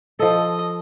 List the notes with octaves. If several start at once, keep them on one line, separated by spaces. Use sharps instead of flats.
F3 A4 D#5